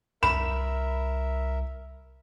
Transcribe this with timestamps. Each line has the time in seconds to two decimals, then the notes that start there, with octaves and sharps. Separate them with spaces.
0.23 C2 A#4 E5 B5 E7